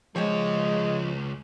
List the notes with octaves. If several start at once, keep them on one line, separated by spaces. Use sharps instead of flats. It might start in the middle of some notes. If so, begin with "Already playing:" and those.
C#2 F3 G#3 G4 G#4 C#5